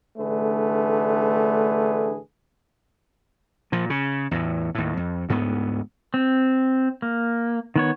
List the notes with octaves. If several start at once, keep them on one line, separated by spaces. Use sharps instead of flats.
A1 D3 A3 D4 G#4 B4
A#2 F3
C#3
E2 A2
D#2 A2
F2
D2 G#2 A#3 B3
C4
A#3
D#3 B3 C#5